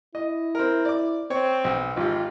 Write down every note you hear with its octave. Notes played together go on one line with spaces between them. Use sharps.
E4 D#5
C4 A#4
D5 D6
C4 C#5
B1
G#1 F4 G4